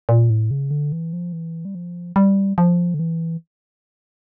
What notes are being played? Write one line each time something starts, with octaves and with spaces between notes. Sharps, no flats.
A#2
A2
C#3
D3
E3
F3
E3
G3
F3
G3
F3
D3
E3